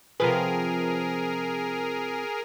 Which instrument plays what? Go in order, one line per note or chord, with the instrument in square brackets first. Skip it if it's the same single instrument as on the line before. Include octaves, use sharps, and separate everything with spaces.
[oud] C3 F3 B4 [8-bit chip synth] G#4 A#4